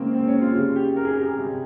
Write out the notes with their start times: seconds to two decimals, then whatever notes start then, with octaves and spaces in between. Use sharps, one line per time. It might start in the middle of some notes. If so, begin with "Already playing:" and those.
Already playing: C#3 G#3 A#3 C4
0.14 C4
0.27 C#4
0.41 F4
0.55 C#3 G3 F4
0.76 G4
0.96 A#4
1.05 G#4
1.14 G4
1.23 G#4
1.38 C3 G3